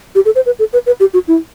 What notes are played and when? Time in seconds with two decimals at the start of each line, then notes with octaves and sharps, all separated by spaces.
0.15 G4
0.25 A4
0.35 C5
0.46 B4
0.59 A4
0.73 B4
0.86 B4
1.00 G4
1.14 F#4
1.28 E4